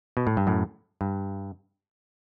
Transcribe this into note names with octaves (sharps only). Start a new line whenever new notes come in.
B2
A2
G2
F#2 A2
G2